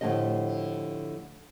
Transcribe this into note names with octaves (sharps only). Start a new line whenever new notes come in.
A2 D3 F3 G4 D#5